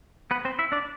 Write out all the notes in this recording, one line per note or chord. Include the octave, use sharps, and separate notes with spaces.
B3 B4
C4 C5
E4 E5
D4 D5